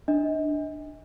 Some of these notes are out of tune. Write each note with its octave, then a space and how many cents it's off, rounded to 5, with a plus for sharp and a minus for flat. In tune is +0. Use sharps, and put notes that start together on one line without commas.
D4 +10 D#5 +35